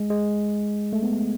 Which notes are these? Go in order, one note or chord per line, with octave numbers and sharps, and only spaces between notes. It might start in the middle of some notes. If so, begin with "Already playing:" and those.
Already playing: G#3
G#3
A3
B3